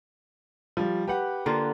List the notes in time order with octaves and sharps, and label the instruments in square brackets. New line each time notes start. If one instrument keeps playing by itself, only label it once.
[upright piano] F3 G3
G4 B4 F#5
[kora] D3 A#3 F4